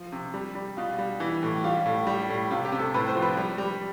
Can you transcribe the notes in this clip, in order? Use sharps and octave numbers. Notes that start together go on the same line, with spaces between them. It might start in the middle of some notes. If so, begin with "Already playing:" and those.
Already playing: F3
C3
G3
G3
B2 F4
G3
E3
A2
G3 F4
A2
G3
A2
C3 F4
G4
C3
A4
A2 B4
C5
F3
B4
G3
G3